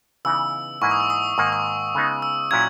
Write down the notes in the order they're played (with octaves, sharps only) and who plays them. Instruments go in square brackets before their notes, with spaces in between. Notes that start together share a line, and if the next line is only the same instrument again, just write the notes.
[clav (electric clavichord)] C#3 E3 B3 D#4 [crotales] E6
[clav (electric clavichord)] G#2 E3 A#3 E4 [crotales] C#6
[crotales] D#6
E6
D#6
[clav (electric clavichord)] G#2 D#3 A#3 [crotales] C#6
[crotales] D#6
[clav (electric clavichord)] C#3 G#3 B3 D#4
[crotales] E6
[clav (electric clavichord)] A#2 F#3 C#4 E4 [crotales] G#6